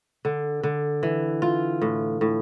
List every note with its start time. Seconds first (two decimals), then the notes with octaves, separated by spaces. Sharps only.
0.25 D3
0.63 D3
1.03 E3
1.42 F4
1.82 A2
2.21 A2